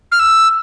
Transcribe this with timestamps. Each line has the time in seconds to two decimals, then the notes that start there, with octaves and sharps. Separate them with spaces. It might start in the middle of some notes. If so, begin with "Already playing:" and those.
0.12 F6
0.20 E6